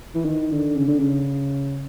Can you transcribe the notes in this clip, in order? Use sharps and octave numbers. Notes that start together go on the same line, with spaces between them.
E3
D#3
D3
C#3
D3
C#3